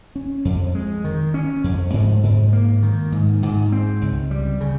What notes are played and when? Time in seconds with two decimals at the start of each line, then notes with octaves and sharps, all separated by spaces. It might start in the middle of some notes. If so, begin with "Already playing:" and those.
0.16 C#4
0.45 F2
0.75 G#3
1.04 D#3
1.34 C#4
1.64 F2
1.94 G#2
2.23 G#2
2.53 A#3
2.82 D#3
3.12 G#2
3.43 G#2
3.72 C4
4.02 C#2
4.31 G3
4.61 C#3